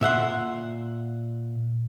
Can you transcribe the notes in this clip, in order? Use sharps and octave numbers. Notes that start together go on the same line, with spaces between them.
A#2 E5 F#5 C6